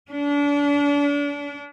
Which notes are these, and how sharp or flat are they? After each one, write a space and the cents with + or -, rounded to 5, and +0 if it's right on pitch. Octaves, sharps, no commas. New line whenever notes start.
D4 -35